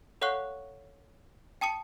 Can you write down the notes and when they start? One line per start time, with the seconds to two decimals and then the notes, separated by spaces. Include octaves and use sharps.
0.21 A4 C#5 F5 F#5 C#6 F#6
1.61 G5 A5 D#6 C#7